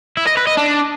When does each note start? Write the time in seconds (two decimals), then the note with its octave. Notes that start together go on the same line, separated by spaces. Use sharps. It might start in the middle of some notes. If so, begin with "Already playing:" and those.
0.17 E4
0.27 D#5
0.37 B4
0.47 D#5
0.57 D4